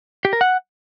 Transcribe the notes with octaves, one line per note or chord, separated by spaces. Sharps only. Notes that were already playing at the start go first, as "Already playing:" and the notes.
G4
A#4
F#5